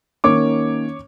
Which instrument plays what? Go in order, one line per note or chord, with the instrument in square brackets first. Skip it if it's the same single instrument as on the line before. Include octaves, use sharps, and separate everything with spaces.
[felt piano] D#3 A#3 C#4 [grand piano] C#5 D6